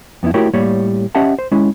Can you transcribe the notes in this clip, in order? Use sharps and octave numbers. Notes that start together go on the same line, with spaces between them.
F2 B3 C#4 E4
A3 E4 F#4 G4 A#4 C#5
A2 G3 A#3 C#5
C#4 G4 D#5 E5 F#5 A5
C5
G#3 C#4 E4